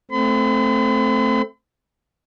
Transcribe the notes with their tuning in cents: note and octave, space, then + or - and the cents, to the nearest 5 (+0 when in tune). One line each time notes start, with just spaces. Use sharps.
A3 +0 C4 +0 B5 +45